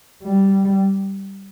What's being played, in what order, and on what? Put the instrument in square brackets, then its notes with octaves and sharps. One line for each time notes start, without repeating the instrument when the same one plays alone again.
[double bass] G3